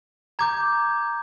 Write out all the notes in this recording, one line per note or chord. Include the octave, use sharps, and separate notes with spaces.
A#5 D6 G6 G#6